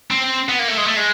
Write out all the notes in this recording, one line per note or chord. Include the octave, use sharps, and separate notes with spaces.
C4
B3
A#3
A3
G#3
A3
G#3